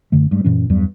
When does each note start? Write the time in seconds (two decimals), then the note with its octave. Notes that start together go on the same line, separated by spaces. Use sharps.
0.12 F#2 D3 A3
0.31 G2 G#3
0.44 F#2 A#2 E3 C#4
0.70 E2 G2 F#3 G3